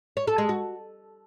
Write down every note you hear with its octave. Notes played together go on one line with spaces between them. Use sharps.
C#5
A4
G#3
F#4